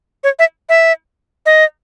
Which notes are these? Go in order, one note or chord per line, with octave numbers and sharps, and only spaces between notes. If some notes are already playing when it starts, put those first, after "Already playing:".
C#5
E5
E5
D#5